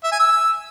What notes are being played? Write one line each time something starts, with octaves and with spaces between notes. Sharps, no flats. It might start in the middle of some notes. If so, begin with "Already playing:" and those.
E5
G#5
E6